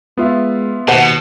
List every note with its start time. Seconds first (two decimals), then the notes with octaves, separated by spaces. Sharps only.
0.17 G#3 B3 F4 E5
0.88 D#2 B2 B4 C5 F#5 A5